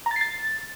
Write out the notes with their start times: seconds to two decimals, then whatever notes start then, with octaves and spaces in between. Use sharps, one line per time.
0.06 A#5
0.11 A6
0.16 C7
0.21 A6